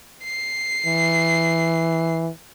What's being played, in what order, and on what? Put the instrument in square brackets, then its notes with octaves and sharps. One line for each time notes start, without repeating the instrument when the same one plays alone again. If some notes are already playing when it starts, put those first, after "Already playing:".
[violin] C7
[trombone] E3